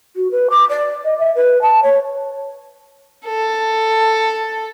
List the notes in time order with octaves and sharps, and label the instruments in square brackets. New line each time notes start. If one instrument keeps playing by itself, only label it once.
[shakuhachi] F#4
B4
D6
D5
D#5
E5
B4
A5
C#5
[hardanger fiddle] A4